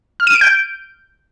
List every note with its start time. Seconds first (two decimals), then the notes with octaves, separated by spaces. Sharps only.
0.20 F6
0.27 D#7
0.34 D7
0.41 G6